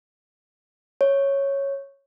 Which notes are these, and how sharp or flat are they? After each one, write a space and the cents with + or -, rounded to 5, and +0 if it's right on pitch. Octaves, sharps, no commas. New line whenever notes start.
C#5 -5